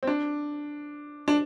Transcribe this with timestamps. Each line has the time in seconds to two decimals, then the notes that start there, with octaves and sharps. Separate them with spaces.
0.03 C4
0.07 D4
1.28 D4